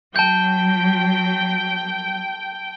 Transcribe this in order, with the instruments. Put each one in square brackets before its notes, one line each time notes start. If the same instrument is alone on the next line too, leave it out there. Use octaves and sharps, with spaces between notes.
[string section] F#3 [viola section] G5 [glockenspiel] A5 G6